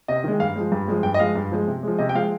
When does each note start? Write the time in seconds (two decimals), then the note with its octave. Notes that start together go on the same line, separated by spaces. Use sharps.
0.08 C3 D#5
0.24 D#3 G#3
0.40 G2 F5
0.56 F3 G#3
0.72 G2
0.88 F3 G#3
1.03 G2 G5
1.14 D#5
1.19 F3 G#3 F5
1.35 G2
1.51 F3 G#3
1.67 C3
1.83 F3 G#3
1.98 C3 D#5
2.09 G5
2.15 F3 G#3 F5